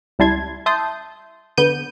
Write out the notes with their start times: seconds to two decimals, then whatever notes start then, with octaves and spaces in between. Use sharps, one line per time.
0.19 C#2 G3 E4 A5 C6 G#6
0.66 E5 A5 C6 D#6 G6
1.57 D3 B3 G6 D#7